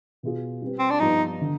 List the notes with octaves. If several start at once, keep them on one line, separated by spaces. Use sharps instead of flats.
B2 B3 F4 G#4
G3 C4 G4 B4
C4
D4
G2 F3 B3 D#4 F4 B4
D3